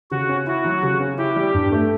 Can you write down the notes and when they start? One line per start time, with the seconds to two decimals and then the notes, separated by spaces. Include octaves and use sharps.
0.11 C#3 F#4
0.29 C#4
0.47 E4 F#4
0.65 F#3
0.83 C#3
1.00 C#4
1.18 E4 G4
1.36 G3
1.54 G2
1.71 A3